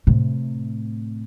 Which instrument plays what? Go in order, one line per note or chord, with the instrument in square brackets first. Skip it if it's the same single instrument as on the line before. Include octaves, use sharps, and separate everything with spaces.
[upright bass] A2 C3